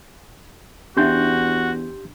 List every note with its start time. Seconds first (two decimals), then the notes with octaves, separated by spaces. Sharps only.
0.97 E2 C#4 D4 F#4 G4 E5 C6 G6